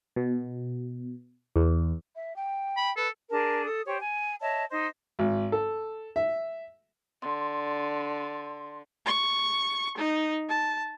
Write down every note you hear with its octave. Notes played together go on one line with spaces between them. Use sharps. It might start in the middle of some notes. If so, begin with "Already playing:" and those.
B2
E2
E5
G5
B5
A4 B4
D4 G#4 A#4 A5
A4 D#6
G4 C5 C#5
G#5
C#5 D#5 E5 A5
D#4 C5 D#5
G#1
A4
E5
D3 C6
C#6
D#4
A5